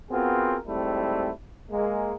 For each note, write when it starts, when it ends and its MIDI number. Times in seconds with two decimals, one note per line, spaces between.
0.10 0.57 59
0.10 0.57 60
0.10 0.57 65
0.10 0.57 66
0.10 0.57 68
0.10 0.57 70
0.66 1.29 44
0.66 1.29 55
0.66 1.29 57
0.66 1.29 60
0.66 1.29 64
1.70 2.13 56
1.70 2.13 58